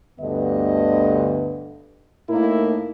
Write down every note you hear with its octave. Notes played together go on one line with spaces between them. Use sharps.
D2 G2 D3 B3 D#5
A2 A#3 D#4 E4 A#4